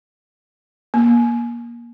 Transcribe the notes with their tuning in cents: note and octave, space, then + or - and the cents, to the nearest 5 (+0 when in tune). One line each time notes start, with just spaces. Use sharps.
A#3 +25